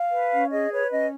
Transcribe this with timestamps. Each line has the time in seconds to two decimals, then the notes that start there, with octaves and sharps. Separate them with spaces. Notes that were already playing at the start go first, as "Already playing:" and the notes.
Already playing: F5
0.11 B4
0.31 C#4
0.51 G#4 D#5
0.72 B4 C#5
0.91 C#4 D#5